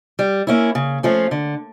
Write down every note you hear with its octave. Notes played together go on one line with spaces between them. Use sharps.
G3
A#3 C#4 E4
C#3
F3 A3 C#4 F4
D3